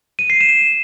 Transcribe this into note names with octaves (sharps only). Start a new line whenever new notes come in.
D#7
C7
E7